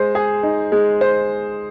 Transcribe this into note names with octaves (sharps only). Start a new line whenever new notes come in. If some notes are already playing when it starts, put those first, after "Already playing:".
Already playing: G#3 C5
G#4
D#4
G#3
C5